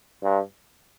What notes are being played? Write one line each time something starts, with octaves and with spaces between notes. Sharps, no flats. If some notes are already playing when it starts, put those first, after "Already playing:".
G2